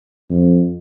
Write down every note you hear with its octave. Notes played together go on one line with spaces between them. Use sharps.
F2